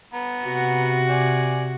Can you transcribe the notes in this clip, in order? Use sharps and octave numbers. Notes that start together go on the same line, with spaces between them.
B3 A#5
C3 F#4
D5 G#5